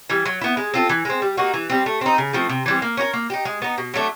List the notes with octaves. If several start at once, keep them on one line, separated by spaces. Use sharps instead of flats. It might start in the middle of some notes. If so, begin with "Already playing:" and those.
E3 G3
F#3
B3 E4
G#3
C4 F4 A4
E3
G#3 C4
G3
A#3 D#4 F#4
E3
G3 C4
A3
C4 D#4
C#3
F3 A3 C4
C3
E3 G3 C4
A#3
C#4 F#4 A#4
A#3
D#4 G4
G#3
B3 D#4
B2
F#3 A3 D4